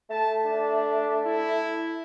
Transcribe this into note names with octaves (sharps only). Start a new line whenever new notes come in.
A3 A5
D4
E4